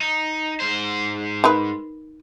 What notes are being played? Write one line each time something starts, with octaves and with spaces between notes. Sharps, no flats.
D#4
G#2 C5
D#4 A#4 B4